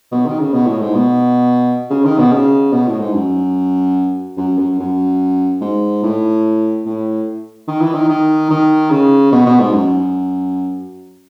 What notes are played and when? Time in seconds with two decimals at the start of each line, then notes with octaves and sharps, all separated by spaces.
0.12 B2
0.26 D#3
0.40 C#3
0.53 B2
0.66 A2
0.81 G#2
0.95 B2
1.90 C#3
2.04 D#3
2.18 B2
2.32 C#3
2.72 B2
2.87 A2
3.00 G#2
3.14 F#2
4.37 F#2
4.58 F#2
4.79 F#2
5.61 G#2
6.03 A2
6.85 A2
7.67 D#3
7.81 E3
7.94 D#3
8.09 D#3
8.50 D#3
8.90 C#3
9.32 B2
9.46 B2
9.60 G#2
9.73 F#2